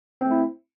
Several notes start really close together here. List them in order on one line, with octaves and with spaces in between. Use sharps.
C4 A3 E4